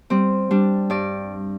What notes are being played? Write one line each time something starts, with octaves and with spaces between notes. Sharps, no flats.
G3 C4
G3 D4
G2 D5